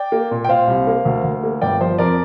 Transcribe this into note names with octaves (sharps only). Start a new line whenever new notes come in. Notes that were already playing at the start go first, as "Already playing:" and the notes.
Already playing: D5 G5
A#3
A#2
G5
A#2 C5 F5
C2
A#3
D2
D2
A#3
G1 D5 G5
F3 C5
F2 A#4 D5